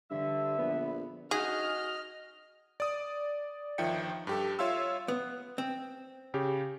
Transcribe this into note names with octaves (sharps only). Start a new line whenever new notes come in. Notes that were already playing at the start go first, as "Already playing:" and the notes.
G2 D3 E5
A#1 B3
C#4 D#4 F#4 G#4 D#5 F6
D5 D#6
G1 D#3 F3 E5 G5 C#7
G2 G4 A4
F4 C#5 E5 F5 C6 E6
B3
C4
C#3 G4